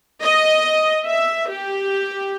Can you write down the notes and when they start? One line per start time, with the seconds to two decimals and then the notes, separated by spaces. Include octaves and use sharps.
0.23 D#5
1.04 E5
1.49 G4